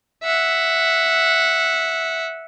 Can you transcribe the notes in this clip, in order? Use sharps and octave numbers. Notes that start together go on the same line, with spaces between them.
E5 F#5